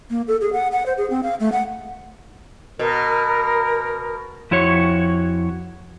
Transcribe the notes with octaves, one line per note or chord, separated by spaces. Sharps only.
A#3
A4
G#4
F#5
F#5
C5
G#4
C4
F5
A3
F#5
B2 A#4
F2 E4 F#4 C#5